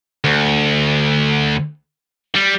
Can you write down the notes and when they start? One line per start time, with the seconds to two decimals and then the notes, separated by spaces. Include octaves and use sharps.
0.24 D2
2.36 G3